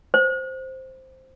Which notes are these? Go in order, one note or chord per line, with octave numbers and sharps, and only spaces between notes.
C5